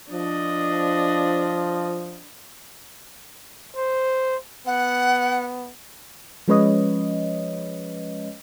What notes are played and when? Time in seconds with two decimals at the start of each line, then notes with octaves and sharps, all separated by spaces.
0.12 F3 D4 D#5
3.75 C5
4.66 B3 F#5
6.48 F3 G#3 C#4 B4 C#5 D#5